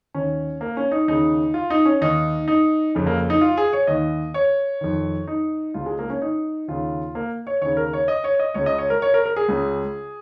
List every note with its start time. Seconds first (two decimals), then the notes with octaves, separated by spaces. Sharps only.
0.14 D#2 D#3 C#4
0.61 A#3
0.77 C#4
0.92 D#4
1.08 D#2 C#3 D#4
1.54 F4
1.70 D#4
1.85 C#4
2.01 D#2 D#3 D#4
2.48 D#4
2.95 F2 C#3
3.07 A#3
3.30 D#4
3.41 F4
3.57 G#4
3.73 C#5
3.87 D#2 D#3 D#5
4.34 C#5
4.81 F2 D#3
5.27 D#4
5.74 C#2 C#3 F4
5.86 G#3
5.99 A#3
6.10 C#4
6.22 D#4
6.68 D#2 C#3 F4
7.15 A#3
7.47 C#5
7.62 D#2 C#3 C#5
7.77 A#4
7.93 C#5
8.08 D#5
8.24 C#5
8.40 D#5
8.54 C#2 C#3 C#5
8.66 D#5
8.78 C#5
8.90 A#4
9.02 C#5
9.14 A#4
9.26 A#4
9.36 G#4
9.48 C#2 C#3